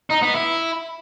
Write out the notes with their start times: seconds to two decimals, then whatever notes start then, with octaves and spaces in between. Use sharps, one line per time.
0.11 D#4
0.23 B3
0.35 E4